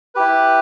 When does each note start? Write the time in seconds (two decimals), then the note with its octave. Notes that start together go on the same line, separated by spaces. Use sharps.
0.15 E4 G4 B4